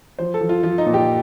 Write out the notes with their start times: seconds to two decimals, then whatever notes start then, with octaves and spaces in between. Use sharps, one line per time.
0.19 F3 C5
0.34 A4
0.41 F3
0.49 F4
0.63 F3 F4
0.78 D#4
0.86 A#2
0.94 G4